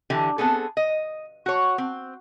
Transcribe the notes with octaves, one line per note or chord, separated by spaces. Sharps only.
D3 E3 G4
B3 C4 G#4 A4
D#5
F#4 C#5
C4